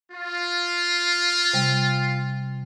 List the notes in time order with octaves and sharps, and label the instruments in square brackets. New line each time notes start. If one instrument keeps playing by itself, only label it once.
[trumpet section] F4
[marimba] C3 G3